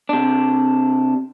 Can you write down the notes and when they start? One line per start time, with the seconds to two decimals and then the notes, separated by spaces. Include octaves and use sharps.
0.09 C3 D4